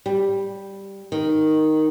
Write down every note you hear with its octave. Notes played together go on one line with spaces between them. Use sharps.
G3
D#3